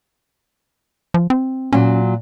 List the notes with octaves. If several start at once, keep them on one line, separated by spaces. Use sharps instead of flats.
F3
C4
A#2 F#3 C#4